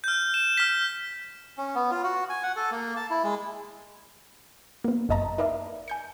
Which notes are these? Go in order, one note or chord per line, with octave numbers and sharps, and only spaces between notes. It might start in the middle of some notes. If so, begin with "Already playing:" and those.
F6 G6
E7
F6 B6
C#4
B3
F4
F#4
G#5
F#5
A4
A#3
A5
E4
G#3
A#3 B3
G1 F#2 D#5 A5 A#5
D#4 A#4 B4 D5 E5 F5
G#5 G6 C#7